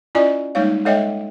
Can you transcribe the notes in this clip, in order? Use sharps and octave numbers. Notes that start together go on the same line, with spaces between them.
C#4 E4 F4 D5 D#5 G#5
G3 G#3 A#3 D#4 C#5 F5
G#3 A4 C#5 D#5 E5 G5